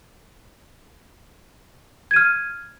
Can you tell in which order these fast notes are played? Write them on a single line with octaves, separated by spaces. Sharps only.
G#6 D#7 F6